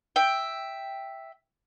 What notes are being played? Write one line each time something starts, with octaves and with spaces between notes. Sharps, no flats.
E5 G5